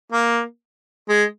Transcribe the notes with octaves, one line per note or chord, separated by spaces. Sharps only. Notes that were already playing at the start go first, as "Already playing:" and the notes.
A#3
G#3